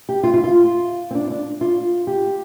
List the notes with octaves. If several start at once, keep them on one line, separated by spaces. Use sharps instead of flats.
G4
F4
F4
F4
C4
D4
D4
F4
G4